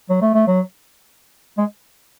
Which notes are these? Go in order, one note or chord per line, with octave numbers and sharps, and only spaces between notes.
F#3
A3
A3
F#3
G#3